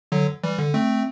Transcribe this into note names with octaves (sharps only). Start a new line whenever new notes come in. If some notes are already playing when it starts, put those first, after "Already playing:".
D3 F#3
E3 G3
D3
A3 C4